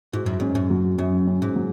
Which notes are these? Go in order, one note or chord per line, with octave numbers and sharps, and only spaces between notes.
G#2 F#4
F#2
G#2 C#4
F#2
F#3
F#2 C#4
C#4
G#2
F#3